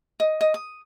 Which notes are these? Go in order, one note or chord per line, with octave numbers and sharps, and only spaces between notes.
D#5
D#5
D#6